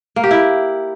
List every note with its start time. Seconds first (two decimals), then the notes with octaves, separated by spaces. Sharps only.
0.16 A#3
0.24 G4
0.31 E4